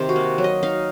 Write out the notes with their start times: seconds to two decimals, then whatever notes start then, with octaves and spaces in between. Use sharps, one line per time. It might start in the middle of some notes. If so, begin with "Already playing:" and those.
Already playing: C3 D#3 C5
0.09 F#4
0.16 A#3
0.38 F#3
0.44 D#5
0.63 D#4 F5